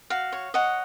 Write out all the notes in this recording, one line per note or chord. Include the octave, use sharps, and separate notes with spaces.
F#4 F5
C#5
C#5 D#5 F#5